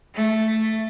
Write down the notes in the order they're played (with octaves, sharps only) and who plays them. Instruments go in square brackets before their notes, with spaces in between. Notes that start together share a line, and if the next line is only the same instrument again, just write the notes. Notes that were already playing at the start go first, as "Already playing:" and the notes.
[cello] A3